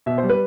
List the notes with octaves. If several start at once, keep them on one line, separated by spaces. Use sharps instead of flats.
B2 E5
C5
G3
B4